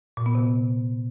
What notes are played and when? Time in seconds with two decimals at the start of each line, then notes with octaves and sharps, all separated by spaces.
0.17 A#2
0.26 B3
0.35 C3